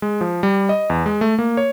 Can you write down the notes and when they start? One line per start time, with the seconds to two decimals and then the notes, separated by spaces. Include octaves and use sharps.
0.02 G#3
0.21 F3
0.43 G3
0.69 D#5
0.90 E2
1.06 G#3
1.21 A3
1.39 A#3
1.57 C#5